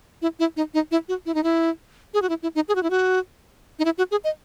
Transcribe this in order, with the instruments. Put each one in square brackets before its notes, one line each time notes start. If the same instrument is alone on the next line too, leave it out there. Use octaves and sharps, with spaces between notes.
[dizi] E4
E4
D#4
D#4
E4
F#4
E4
D#4
E4
G#4
F#4
E4
E4
D#4
G#4
F#4
E4
F#4
D#4
E4
F#4
G#4
D#5